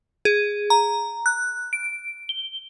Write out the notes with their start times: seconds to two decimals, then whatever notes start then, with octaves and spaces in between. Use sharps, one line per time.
0.25 G#4
0.70 A#5
1.26 F#6
1.73 D7
2.29 G7